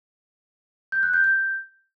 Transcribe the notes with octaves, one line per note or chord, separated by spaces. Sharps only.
G6
F#6
G6
G6